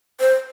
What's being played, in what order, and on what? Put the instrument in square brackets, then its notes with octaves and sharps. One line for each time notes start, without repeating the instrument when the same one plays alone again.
[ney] C5